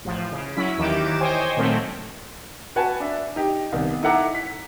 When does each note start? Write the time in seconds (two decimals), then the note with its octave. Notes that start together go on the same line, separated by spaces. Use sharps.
0.04 A1 F3
0.32 C#3
0.57 F#3 C#4 E4 B6
0.78 D#2 D#3 E3 G4 D6 E7
1.21 C5 C#5 D#5 G5 G#5
1.57 A#2 D#3 F#3 A3 C4
2.76 F#4 B4 F#5 G#5 A5
3.00 D4 E5
3.36 D#4 G4
3.72 C2 D#3 B3
4.03 D#4 E4 A4 F#5 A#5 D6
4.35 B6